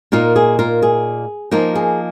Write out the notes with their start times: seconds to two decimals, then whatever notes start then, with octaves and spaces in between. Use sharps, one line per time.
0.12 A#2 A#3 D#4 F4 A#4
0.36 G#4
0.59 F4 A#4
0.82 G#4
1.51 F3 A#3 D#4 F4 A#4
1.75 G#4